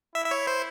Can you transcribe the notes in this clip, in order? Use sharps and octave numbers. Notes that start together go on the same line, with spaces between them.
E4 E5
E5
C#5
C5